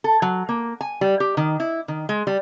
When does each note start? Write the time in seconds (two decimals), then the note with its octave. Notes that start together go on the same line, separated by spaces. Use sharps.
0.04 A4
0.22 F#3
0.49 A#3
0.81 G#5
1.01 G3
1.20 G4
1.37 D#3
1.60 E4
1.88 D#3
2.09 G#3
2.27 G3